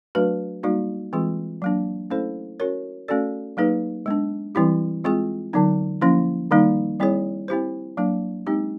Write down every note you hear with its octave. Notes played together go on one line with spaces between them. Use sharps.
F#3 A3 D4 F#4 B4
G3 A#3 D#4 F#4
E3 G#3 C4 F4 G#4
F#3 A#3 D4
A3 C#4 E4 A4 C5
C#4 F#4 A#4 C#5
A3 C#4 F#4 A4 D5
F#3 A#3 D#4 G#4 B4
G#3 B3 D4
E3 G3 C4 E4 G4
G#3 C4 F4 G#4
D3 F#3 B3 D#4
F3 A#3 C#4 E4
D#3 G3 A#3 D#4
G3 C4 E4 G#4 C#5
C4 E4 G4 C5
F#3 A#3 D4
G#3 C4 D#4 G4